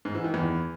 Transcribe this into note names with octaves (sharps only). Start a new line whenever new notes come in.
G#2
E3
D#3
E2